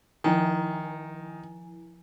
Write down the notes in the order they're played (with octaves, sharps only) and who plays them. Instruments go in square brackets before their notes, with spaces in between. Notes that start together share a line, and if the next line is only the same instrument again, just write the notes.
[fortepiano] D#3 [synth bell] F3 E4 G#5